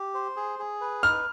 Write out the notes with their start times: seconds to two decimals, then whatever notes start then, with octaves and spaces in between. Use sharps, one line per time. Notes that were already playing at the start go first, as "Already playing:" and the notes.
Already playing: G4
0.14 C5
0.36 G#4
0.59 G#4
0.81 B4
1.03 D#4 F6